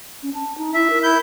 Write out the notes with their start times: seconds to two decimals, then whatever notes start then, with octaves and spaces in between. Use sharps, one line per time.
0.23 C#4
0.34 A5
0.58 D#4
0.74 E4 E5
0.90 A#4
1.03 E4 G6